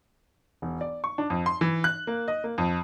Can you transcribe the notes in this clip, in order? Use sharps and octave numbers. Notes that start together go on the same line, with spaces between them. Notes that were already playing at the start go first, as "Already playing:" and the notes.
E1
D5
C#6
D4
F2
C6
E3
F#6
A#3
D#5
A#3
F2